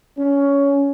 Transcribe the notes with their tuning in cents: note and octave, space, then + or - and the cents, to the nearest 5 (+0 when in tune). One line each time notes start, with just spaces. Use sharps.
C#4 +15